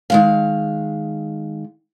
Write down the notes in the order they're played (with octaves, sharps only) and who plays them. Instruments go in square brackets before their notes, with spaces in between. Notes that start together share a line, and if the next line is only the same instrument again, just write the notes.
[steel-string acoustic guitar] D#3 G#3 F5